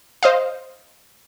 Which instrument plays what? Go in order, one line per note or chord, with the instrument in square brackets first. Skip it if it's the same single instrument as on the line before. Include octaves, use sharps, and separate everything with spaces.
[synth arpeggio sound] C5 D#5 F5